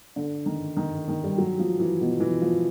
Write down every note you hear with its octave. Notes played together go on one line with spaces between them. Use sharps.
D3
D#3
D#3
D#3
G3
F#3
F3
E3
B2
E3
F3